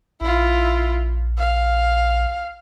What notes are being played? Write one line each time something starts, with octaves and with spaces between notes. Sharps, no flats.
A#1 E4 F4
F5